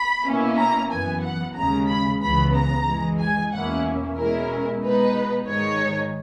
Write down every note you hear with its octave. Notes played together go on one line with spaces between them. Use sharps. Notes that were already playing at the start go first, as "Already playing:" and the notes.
Already playing: B5
B2 A#3 C#4 E4
A#5
F#2 E3 B3 G#5
F#5
D#2 C#3 G#3 A#5
B5
C#2 C#3 E3 B3 B5
A#5
F#2 E3 G#3
G#5
E2 B2 A#3 C#4 E4 F#5
B2 G#3 C#4 E4 A#4
B2 G#3 B3 D#4 B4
G#2 D#3 G#3 D#4 C#5